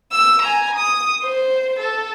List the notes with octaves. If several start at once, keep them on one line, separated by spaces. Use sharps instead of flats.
E6
G#5 A#5
D#6
C5
A4